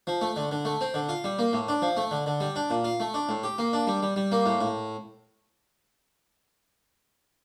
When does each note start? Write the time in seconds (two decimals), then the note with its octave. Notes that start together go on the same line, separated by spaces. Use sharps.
0.07 F3
0.21 A3
0.36 D3
0.51 D3
0.65 A3
0.81 C4
0.94 D3
1.09 F4
1.24 G3
1.39 A#3
1.53 A2
1.68 D4
1.82 F3
1.97 A3
2.11 D3
2.26 D3
2.41 G3
2.56 D4
2.70 A#2
2.84 F4
3.00 A3
3.14 D4
3.29 A2
3.43 G4
3.58 A#3
3.73 D4
3.87 G3
4.02 G3
4.16 G3
4.32 A#3
4.46 A2
4.61 A2